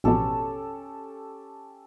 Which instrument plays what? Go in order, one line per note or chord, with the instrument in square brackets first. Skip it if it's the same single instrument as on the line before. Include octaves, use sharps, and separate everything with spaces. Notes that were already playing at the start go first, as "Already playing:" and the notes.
[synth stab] A1 F2 B2 [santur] C#4 G4 A4